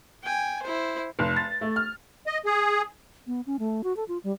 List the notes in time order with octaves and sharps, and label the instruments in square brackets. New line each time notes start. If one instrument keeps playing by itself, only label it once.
[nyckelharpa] G5 G#5
E4 C5
[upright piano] F1
A6
A3
F6
[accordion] D#5
G#4
[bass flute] B3
C#4
A3
F#4
A4
F4
G3